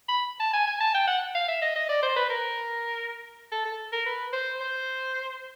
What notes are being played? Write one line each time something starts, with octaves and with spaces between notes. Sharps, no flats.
B5
A5
G#5
G#5
A5
G5
F#5
F5
E5
D#5
D#5
D5
C5
B4
A#4
A4
A4
A#4
B4
C5
C5